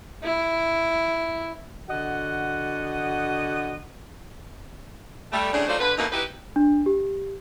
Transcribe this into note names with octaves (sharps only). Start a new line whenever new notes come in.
E4
D3 F#4 D#5 F#5
G3 A3
A2 C#3 C4 D4
F#3 A3 D#4 F4 C5 D5
D3 B4
F#2 B2 A3 A#3 D#4
D#4 E4 F#4 G4 B4
D4
G4